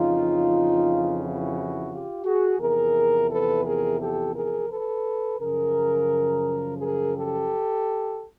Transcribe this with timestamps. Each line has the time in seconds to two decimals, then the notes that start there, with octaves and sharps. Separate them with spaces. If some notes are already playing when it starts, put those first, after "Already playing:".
Already playing: F2 C#3 E3 D#4 F4
1.20 E4 F#4
1.89 F4 G4
2.24 F#4 G#4
2.59 E2 C3 F3 G#4 A#4
3.29 A4 B4
3.64 G#4 A#4
4.00 G4 A4
4.34 G#4 A#4
4.69 A4 B4
5.38 F#2 C#3 F3 G#4 A#4
6.78 G#4 A#4
7.13 G4 A4